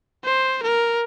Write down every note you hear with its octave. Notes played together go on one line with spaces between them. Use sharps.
C5
A#4